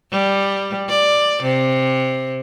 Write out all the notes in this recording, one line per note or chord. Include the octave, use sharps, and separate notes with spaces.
G3
D5
C3